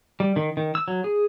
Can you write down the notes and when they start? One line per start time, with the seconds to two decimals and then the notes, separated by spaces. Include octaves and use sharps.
0.20 G3
0.36 D#3
0.57 D#3
0.75 E6
0.88 F#3
1.04 G#4